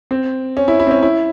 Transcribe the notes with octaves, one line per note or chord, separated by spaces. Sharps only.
C4
C#4
E4
E4
C4
C#4
E4